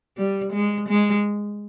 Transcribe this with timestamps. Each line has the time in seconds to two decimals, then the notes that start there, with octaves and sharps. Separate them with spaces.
0.17 G3
0.53 G#3
0.88 G#3